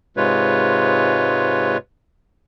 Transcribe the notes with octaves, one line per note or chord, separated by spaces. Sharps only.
G#2 C3 G#3 F4 B4 C#5